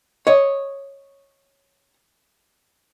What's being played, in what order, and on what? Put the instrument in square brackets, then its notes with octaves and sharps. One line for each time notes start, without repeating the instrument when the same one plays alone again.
[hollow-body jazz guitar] C#5 D#5